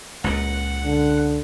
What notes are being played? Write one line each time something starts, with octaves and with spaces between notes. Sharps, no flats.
C#2 A#2 F#5
D3